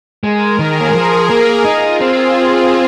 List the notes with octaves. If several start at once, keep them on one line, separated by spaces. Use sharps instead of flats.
G#3 A#4
D#3 G#4
A#3
G#3
F3
A#3
D#4 F4
C4 G#4
G#4